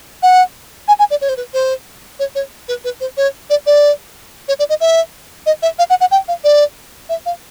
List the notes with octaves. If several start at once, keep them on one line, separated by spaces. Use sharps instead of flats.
F#5
G#5
G#5
D5
C#5
C5
B4
C5
C#5
C#5
B4
B4
C5
C#5
D5
D5
C#5
D5
D#5
E5
D#5
E5
F5
F#5
F#5
G5
F5
D5
E5
F5